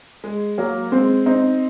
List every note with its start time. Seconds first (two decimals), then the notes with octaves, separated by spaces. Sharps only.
0.24 G#3
0.58 F#3 A#3
0.92 G#3 C4
1.26 C4 D#4